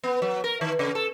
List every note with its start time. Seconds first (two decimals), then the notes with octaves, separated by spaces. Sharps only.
0.04 B3
0.22 F#3
0.44 A#4
0.61 D#3
0.79 C#3
0.95 A4